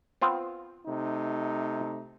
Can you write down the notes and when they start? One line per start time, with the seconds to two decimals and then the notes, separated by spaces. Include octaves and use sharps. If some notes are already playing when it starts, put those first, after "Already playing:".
0.22 B3 C4 F4
0.85 C3 A3 D#4